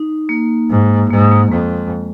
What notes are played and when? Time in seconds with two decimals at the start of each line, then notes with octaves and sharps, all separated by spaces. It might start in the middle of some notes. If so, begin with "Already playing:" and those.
Already playing: D#4
0.29 A#3
0.70 G#2
1.10 G#2 A#3
1.32 A#3
1.51 F2 G#3